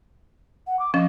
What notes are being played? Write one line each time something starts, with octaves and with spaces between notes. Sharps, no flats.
F#5
D6
F3 C#4 D#5